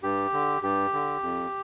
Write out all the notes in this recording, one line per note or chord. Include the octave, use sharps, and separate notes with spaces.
G2 G4
D3
G2 G4
D3
F2